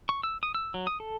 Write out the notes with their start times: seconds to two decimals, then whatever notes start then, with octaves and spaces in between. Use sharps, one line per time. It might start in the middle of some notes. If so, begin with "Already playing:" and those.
0.09 C#6
0.23 E6
0.43 D#6
0.55 E6
0.74 F#3
0.87 D#6
1.00 A4